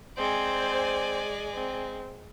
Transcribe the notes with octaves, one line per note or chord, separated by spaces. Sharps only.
G#3 C4 C5 D5 G#5
C4